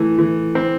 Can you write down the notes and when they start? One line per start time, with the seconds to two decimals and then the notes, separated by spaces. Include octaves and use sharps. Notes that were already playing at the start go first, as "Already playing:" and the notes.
Already playing: E3 A3
0.19 E3
0.55 C4